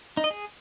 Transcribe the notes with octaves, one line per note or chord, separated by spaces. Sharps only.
D#4
D#5
G#4